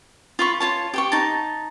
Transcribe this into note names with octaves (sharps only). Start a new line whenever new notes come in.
F4 B5 C#6
F4 C#5 A5
G4 G5 C#6
D#4 A5